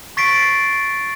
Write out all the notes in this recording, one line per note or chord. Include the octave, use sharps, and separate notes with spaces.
C#6 A6 B6 C7 D7